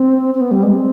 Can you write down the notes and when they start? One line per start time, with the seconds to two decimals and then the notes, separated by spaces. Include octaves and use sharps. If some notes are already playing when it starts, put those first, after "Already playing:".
Already playing: C4
0.35 C4
0.41 B3
0.51 G3
0.62 G#3
0.73 C4